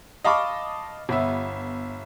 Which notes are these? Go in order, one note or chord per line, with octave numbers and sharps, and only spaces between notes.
D#5 F5 A5 B5 C#6 D6
G1 B3 E5